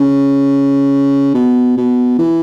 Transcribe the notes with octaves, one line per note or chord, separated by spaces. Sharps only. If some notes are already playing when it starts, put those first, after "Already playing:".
Already playing: C#3
B2
B2
E3